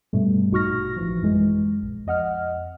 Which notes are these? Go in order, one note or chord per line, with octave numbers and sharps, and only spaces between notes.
G2 B2 G3 A3
A#1 D#4 F#4 C#6 F6 A#6
A1 E3 F3
F#2 E3 G#3
A#1
F2 D#5 F#5 F6